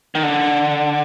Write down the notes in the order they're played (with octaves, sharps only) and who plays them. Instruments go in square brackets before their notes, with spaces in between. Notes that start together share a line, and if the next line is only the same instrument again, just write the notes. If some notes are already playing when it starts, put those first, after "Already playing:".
[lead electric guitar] D#3
D3